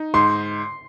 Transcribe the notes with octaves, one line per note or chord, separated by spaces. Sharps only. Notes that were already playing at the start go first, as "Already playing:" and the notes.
Already playing: D#4
G#2 C6